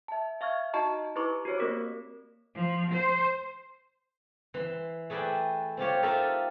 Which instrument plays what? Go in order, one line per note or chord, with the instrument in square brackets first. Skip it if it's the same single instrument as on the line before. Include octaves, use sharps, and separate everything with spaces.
[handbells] E5 A5
E5 F5 C#6 F6 G#6
D#4 F#4 D#5 A5 A#5 C#6
E4 G4 B4 A#5 C#6 D6
F#4 G4 C5 C#5
A#3 C4 A#4 D5 D6
[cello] F3
C5
[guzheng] E3 C6
A3 G#4 B4 D5 E5 G5
C4 F4 G4 C#5
D#4 F4 A4 A#4 D5 E5